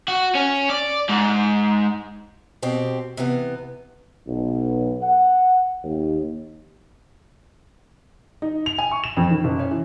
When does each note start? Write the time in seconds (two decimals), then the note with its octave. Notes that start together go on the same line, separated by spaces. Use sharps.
0.08 F#4
0.35 C#4
0.70 D5
1.09 G#2
2.62 B2 C4 G4
3.17 C3 E3 B3
4.27 B1
5.02 F#5
5.84 D#2
8.42 D#4
8.66 F7
8.78 G#5
8.91 C#6
9.04 E7
9.17 F2
9.30 D#3
9.44 F#1
9.59 C#4
9.71 E3